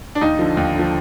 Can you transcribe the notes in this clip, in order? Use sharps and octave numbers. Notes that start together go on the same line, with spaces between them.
D4
D#2 D#4
D3 F3
D#2
D3 F3